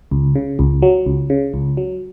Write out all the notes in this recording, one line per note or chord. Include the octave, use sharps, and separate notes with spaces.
C#2
C#3
C#2
F#3
C#2
C#3
C#2
F#3